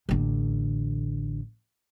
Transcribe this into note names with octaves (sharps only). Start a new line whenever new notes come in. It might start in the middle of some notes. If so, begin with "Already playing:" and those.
A1 D3